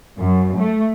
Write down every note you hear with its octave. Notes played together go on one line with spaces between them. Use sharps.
F#2
A3